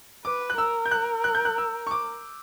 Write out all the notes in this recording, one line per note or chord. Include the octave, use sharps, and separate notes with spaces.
B4 D6
F#6
A#4 E6
G6
F#6
F#6
G6
F#6
E6
C#6
D6